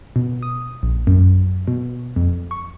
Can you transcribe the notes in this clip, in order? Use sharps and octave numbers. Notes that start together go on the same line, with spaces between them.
B2
D#6
A#1
F#2
B2
F2
C#6